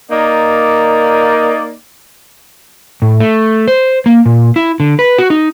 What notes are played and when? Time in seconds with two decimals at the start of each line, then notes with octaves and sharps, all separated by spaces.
0.11 A#3 D#4 D5
3.02 A2
3.20 A3
3.68 C5
4.06 A#3
4.26 A#2
4.56 E4
4.80 D3
4.99 B4
5.18 F#4
5.30 D#4